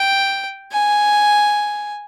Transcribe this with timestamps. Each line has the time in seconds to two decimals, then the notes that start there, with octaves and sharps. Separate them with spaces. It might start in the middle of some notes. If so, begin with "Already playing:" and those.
Already playing: G5
0.71 G#5